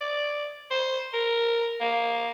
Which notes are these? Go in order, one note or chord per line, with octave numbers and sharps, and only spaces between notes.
D5
C5
A#4
A#3